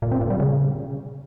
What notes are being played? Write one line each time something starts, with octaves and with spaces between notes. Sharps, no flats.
A#2
C4
A#2
G3
C#3